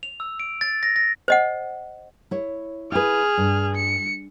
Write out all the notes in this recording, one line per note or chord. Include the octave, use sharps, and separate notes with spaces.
F7
E6
D7
A6
A#6
A#6
C5 D#5 F#5
E4 C#5
E4 G#4 B4 F6
G2
C#7